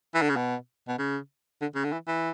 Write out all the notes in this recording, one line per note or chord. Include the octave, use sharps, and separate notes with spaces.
E3
D3
C#3
B2
B2
C#3
D3
C#3
D3
E3
E3